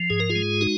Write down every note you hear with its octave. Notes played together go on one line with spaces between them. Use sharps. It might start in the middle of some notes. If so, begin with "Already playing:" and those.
Already playing: F3
G#2 G#4
A#4
F4 G#4
G#3
D#4 F#4